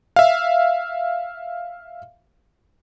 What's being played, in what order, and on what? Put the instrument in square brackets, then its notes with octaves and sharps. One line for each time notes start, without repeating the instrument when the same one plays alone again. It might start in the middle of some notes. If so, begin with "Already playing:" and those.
[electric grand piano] E5 F5